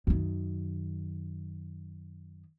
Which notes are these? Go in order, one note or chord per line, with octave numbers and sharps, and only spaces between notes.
F#2 D#3